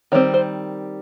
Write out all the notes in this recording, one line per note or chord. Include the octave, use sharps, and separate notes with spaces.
D#3 G3 C4 C#5
C5